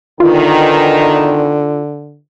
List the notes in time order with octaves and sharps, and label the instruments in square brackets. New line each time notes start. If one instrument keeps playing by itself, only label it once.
[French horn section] E2 D#3 [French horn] D3 [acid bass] F4